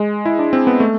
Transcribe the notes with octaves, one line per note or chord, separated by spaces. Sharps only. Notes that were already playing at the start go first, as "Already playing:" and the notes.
Already playing: G#3
E4
D4
C4
B3
A3